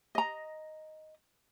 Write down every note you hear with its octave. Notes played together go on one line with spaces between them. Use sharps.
D#5 A#5